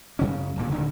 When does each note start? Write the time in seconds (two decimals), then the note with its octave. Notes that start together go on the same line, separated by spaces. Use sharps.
0.19 F#2 C#3 C#4
0.56 D1 D2 G2 A#2
0.71 D1 G2 D3 D#3